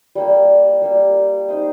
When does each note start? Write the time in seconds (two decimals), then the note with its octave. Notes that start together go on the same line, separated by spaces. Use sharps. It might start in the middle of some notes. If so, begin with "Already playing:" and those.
0.15 G3 A#3 G4
0.82 G3 A#3 G4
1.48 D#4 C5 D#5